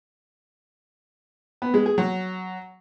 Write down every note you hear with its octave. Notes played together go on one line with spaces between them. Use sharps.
B3
G#3
G#4
F#3